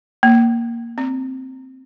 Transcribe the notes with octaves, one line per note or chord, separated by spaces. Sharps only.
A#3
C4